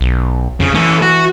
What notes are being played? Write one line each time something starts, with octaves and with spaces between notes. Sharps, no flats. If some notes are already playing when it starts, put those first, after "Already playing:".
B1
F2 C#3
E3 C#4 A4
F#4